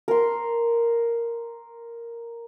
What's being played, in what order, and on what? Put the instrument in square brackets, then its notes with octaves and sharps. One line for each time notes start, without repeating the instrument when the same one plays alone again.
[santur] A#4 C6